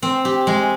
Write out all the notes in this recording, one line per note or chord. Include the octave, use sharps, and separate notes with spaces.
C4
G4
G#3